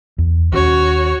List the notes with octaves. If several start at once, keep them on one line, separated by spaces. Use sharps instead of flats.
E2
D#2 C#4 F#4 C#5